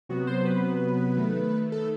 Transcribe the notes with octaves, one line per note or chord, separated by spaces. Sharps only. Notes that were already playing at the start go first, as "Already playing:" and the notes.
C3 F#3 B3 F#4
C5
B4
D#3 A3
A4